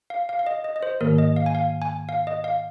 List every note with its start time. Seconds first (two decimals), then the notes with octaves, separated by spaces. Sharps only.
0.10 F5
0.29 F5
0.39 F5
0.47 D#5
0.64 D#5
0.76 D#5
0.83 C5
1.01 G#2 D#3 A#3 A#4
1.18 D#5
1.36 F5
1.46 G#5
1.55 F5
1.82 G#5
2.09 F5
2.27 D#5
2.44 F5